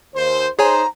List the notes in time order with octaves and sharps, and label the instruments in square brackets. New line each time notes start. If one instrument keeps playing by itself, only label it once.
[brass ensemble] D#2 C5
[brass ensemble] D#4 C5 [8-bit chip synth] G#4 C#5 G#5 [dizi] A#5